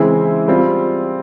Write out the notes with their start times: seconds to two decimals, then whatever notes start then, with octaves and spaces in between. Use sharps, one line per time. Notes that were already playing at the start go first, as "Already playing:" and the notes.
Already playing: C#3 E3 G#3 C4 E4
0.48 G3 C4 F4